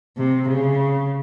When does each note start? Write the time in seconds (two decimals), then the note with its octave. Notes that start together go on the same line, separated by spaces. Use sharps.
0.17 C3
0.49 C#3